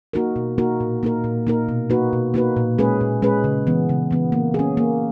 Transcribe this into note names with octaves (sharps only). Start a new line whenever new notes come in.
A#3 D#4 F#4 A#4
B2
A#3 D#4 F#4 A#4
A#2
A#3 D#4 A#4
A#2
A#3 D#4 A#4
B2
A#3 D#4 F#4 B4
B2
A#3 D#4 F#4 B4
A#2
G#3 C#4 G#4 B4
A#2
G#3 C#4 G#4 B4
C#3
E3 B3
C#3
E3 B3
A#3
C#4 G#4
A#3